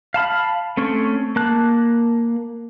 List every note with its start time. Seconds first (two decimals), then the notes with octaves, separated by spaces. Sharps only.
0.14 F5 A5 B5 F6
0.77 A3 C4 C#4 C#5
1.36 A#3 A5 F#6